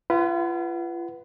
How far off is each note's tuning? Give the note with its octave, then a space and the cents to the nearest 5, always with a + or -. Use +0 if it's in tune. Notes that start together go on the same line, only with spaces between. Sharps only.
F4 -35 B4 +0 F#5 +15